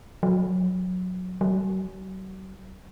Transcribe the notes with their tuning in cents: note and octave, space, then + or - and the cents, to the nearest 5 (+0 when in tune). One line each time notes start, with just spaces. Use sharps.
F#3 -15
F#3 +40